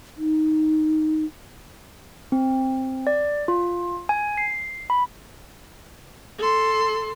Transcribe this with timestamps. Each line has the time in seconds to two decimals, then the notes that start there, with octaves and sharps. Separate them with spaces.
0.17 D#4
2.32 C4
3.07 D5
3.48 F4
4.09 G#5
4.38 C7
4.90 B5
6.38 A4 C6